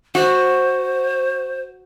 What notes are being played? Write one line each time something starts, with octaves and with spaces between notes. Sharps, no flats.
F#4 C5